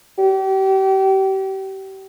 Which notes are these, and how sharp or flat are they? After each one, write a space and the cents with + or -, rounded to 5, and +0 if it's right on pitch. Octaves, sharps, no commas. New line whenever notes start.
G4 -35